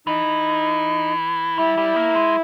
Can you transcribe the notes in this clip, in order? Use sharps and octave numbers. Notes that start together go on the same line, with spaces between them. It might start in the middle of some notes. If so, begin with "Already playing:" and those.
E3 D#4
G3 E4
G3
A#3
G#3